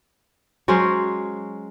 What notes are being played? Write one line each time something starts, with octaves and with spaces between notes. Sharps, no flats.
F#3 G#3 C#4 C5